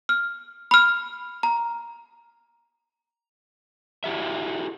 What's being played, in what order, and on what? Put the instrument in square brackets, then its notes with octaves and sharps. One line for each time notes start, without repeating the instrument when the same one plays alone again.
[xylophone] F6
B5 F6
A#5
[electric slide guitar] E4 F#4 G4 E5